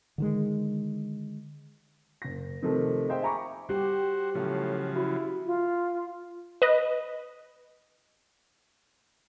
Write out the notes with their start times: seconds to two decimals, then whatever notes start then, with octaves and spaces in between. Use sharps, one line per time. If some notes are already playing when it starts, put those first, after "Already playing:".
0.18 D3 D#3 G#3
2.22 F#1 A#6
2.62 C3 D#3 F3 A3
3.09 D#4 G#4 C5 E5 F5 G5
3.22 E5 G#5 A#5 B5 C#6 D6
3.69 G3 F#4 G4 C5
4.35 A2 C#3 F3 F#3
4.96 E4 F#4
5.46 F4
6.62 B4 D#5